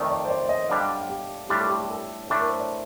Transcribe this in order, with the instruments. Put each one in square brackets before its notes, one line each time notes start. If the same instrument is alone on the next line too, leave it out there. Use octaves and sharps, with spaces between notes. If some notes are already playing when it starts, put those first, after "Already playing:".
Already playing: [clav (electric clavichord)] F2 D#3 A3 [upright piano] D5
[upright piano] D5
C5
D5
D#5
[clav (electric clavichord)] D3 G3 D4 [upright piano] F5
[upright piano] G5
A5
F5
G4
[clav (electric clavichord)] A2 G3 D4 F4 [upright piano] G4
[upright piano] A4
G4
G4
A4
[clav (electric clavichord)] A2 A3 D4 [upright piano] A4
[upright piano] A#4
C5
D5